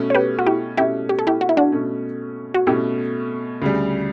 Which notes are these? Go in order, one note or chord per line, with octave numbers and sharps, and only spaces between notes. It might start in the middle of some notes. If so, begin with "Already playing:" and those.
Already playing: B2 A3 C#4
C#5
G4 B4
F#4
E4 G4
B2 A3 C#4 E4 G4
G4
A4
E4 G4
F#4
E4
D4 F#4
B2 A3 C#4
F#4
B2 A3 C#4 E4 G4
D2 C#3 G3